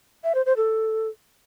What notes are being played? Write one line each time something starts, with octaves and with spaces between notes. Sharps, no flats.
E5
C5
C5
A4